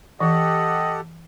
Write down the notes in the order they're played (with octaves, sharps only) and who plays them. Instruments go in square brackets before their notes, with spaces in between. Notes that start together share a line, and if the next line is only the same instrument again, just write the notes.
[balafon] E3 [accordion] G4 A4 F#5 [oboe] D#5